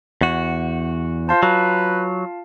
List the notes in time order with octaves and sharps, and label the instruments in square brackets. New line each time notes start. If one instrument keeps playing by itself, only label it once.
[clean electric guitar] E2 F#4
[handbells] F4 F5 A5 [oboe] C5
[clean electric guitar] F#3 [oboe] B4